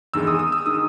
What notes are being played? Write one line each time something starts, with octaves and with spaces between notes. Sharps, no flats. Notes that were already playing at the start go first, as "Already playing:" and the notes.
E2 D#3 G#3 E6
D#6
D#6
E6
D#3 G#3 D#6